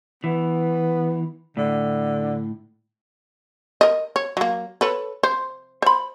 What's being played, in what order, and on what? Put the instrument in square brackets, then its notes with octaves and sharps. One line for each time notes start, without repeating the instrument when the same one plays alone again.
[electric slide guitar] E3 [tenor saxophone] B3
[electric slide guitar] A2 [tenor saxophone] D3
[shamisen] A#4 D#5
C#5
F#3 A#3
A4 B4 C#5
C5
C5 B5